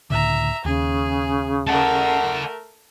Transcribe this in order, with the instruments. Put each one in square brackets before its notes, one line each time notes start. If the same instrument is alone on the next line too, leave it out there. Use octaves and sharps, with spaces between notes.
[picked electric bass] C#2 A2 D3 [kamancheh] E5 A#5
[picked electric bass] D#2 [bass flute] C#3 [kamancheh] G#4
[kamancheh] A3 A#4 [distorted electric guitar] F#5 A5